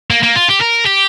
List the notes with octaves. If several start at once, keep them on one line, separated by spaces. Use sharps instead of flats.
A#3
A#3
F4
G4
A#4
G4